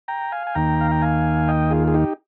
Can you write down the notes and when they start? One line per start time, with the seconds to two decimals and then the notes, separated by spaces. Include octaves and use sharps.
0.08 G5 A#5
0.32 F5 G#5
0.47 G#5
0.54 D#2 D#3 A#3 G5 A#5
0.81 F5
0.91 G5
1.02 F5 G#5
1.48 D#5 G5
1.71 F4 G#4
1.88 G#4
1.94 D#4 G4